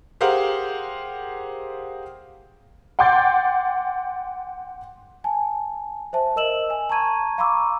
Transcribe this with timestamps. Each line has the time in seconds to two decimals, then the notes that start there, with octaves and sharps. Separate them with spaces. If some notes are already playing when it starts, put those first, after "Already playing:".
0.21 G4 G#4 A#4 C5 F5 F#5
2.99 F#5 G5 C6 D6 G6 A6
5.24 G#5 A5
6.13 C5 E5 A5
6.36 A#4 D#5 E6 E7 F#7
6.70 G#5
6.90 A5 A#5 C#6 G#6 D#7
7.38 F5 A#5 B5 C#6 D6 E6